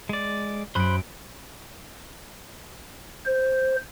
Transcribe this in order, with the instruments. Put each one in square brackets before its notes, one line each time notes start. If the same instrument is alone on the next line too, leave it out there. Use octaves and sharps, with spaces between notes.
[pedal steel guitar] G#3 D5
[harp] F#2 D7 [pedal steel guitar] C5 B5 F#6
[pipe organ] C5